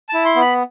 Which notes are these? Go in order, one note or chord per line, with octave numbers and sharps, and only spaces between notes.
E4 A5
C6
B3
B5